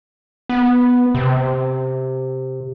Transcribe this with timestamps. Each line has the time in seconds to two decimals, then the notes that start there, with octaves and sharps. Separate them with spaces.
0.49 B3
1.15 C3